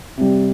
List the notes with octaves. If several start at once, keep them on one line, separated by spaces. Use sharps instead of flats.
C3 G3